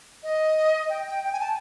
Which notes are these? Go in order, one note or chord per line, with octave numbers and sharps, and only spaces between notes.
D#5
G5
G5
G5
G#5
A5